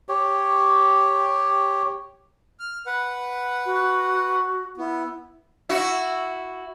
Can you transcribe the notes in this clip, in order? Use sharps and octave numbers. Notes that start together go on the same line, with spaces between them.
G4 C#5
F6
B4 F#5
F#4
B3 E4
E4 F#4